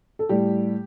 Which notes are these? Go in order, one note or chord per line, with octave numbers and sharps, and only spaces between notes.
A4
A2 G3 G4